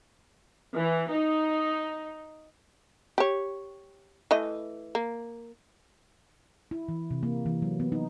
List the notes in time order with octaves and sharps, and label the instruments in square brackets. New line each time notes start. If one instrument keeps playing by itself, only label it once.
[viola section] E3
D#4
[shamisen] G4 C#5
E3 A3 D#5
A#3
[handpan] E4
E3
C3
A#3
E3
F#3
B3
D#4